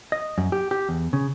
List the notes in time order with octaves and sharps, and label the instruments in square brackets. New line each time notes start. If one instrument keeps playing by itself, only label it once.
[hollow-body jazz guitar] D#5
F#2
G4
G4
E2
C#3